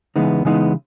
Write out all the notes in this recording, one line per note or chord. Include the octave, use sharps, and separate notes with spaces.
C#3 E3 G#3 B3 D#4
C#3 E3 G#3 B3 D#4